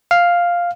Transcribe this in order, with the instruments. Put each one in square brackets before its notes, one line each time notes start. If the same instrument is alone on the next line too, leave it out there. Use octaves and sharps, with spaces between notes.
[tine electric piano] F5